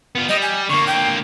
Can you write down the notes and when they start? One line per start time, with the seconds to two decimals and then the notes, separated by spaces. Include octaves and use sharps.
0.15 B3 F4
0.29 G3 D#5
0.42 G#5
0.69 D3 A#3 C#6
0.87 G5